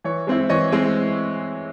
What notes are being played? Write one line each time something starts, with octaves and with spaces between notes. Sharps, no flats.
E3 C#5
G#3 C4 E4
E3 C#5 D#5
G#3 C4 E4